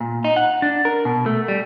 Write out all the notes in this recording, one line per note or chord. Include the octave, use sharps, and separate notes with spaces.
A#2
D#4
F#5
D4
A#4
B2
A3
G3